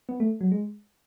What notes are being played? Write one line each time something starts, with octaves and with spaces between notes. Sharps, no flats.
B3
A3
F#3
G#3